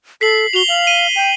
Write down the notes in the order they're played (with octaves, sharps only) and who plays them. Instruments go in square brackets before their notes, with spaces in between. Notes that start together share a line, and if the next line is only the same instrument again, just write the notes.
[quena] A4 [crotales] B6 C7 F#7
[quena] F#4 [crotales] F7 G7
[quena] F5 [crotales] F#7
[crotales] D#7
[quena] G5